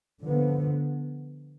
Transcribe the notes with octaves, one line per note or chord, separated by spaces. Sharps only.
D3 F3 B3